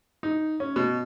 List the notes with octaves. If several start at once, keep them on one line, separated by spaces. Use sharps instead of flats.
D#4
C#4
B2